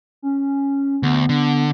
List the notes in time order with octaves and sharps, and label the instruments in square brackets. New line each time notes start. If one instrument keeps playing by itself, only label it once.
[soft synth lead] C#4
[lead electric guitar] D2 [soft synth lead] B3
[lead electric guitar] D3